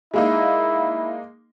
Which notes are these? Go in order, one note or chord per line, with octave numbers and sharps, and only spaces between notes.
G#3 A#3 D#4 E4